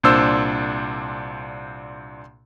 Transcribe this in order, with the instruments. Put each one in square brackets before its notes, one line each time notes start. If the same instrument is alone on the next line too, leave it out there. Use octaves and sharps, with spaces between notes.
[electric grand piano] C2 A#2 D4 C5 E6